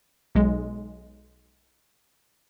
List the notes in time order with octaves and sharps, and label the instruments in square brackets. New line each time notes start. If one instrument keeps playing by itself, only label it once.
[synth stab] B1 G#3